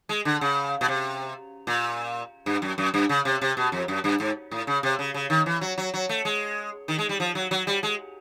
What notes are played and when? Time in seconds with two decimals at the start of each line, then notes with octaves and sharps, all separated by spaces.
0.09 G#3
0.25 D3
0.41 C#3
0.81 B2
0.88 C3
1.67 A#2
2.46 G2
2.62 F#2
2.78 F#2
2.94 G2
3.09 C#3
3.25 C3
3.41 C3
3.57 B2
3.72 F2
3.88 F#2
4.04 G2
4.20 G#2
4.51 A2
4.67 C#3
4.83 C3
4.99 C#3
5.14 C#3
5.30 D#3
5.46 E3
5.61 F#3
5.78 F#3
5.94 F#3
6.09 A3
6.25 G#3
6.88 D#3
6.98 G#3
7.09 G3
7.20 F3
7.35 F#3
7.51 F#3
7.67 G3
7.83 G#3